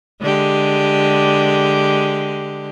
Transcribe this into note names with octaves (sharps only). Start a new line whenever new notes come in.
D3 G#3 G4